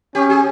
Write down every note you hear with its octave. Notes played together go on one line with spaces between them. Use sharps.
C#4 G4
G#4